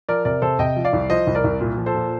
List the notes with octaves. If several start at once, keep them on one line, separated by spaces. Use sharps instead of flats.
F3 A#4 D5
C3 A#4 D5
C3 A4 C5
C3 D#5 G5
F3
D5 F5
C2
F3 C5 D#5
C2
A#4 D5
C2
A#2
F3
A4 C5
A#2